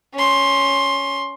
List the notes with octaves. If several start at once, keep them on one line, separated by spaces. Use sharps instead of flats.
C#4 C6